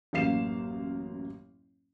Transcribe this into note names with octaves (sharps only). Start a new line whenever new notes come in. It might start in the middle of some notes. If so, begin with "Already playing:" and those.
A1 F#2 A#3 F5 C7 E7